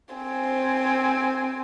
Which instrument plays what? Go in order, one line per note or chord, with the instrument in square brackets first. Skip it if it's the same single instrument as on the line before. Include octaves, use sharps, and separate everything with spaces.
[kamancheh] C4 G#5